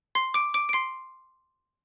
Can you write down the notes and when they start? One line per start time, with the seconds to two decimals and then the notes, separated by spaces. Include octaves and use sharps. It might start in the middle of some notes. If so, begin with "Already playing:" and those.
0.15 C6 C7
0.34 D6 D7
0.54 D6 D7
0.69 D7
0.73 C6 C7